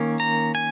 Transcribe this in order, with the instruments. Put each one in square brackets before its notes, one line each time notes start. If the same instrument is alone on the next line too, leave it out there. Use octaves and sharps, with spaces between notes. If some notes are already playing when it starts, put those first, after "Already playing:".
Already playing: [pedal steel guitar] D#3 A#3 C#4
A#5
G#5